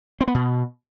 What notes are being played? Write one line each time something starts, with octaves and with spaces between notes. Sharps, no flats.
C4
B3
B2